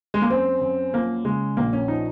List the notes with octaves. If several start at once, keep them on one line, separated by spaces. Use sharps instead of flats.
G#3
A#3
F#2 C4
F#2
F3 A#3
C#3 G#3
A#1 A#3
C#4
F3 D#4